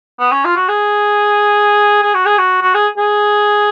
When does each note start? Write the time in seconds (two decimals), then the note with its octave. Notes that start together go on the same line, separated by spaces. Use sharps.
0.19 B3
0.32 C#4
0.45 F4
0.56 F#4
0.68 G#4
2.03 G#4
2.14 F#4
2.26 G#4
2.38 F#4
2.62 F#4
2.74 G#4
2.98 G#4